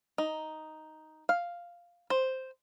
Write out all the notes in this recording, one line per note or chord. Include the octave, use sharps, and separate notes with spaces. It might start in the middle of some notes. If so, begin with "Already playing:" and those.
D#4
F5
C5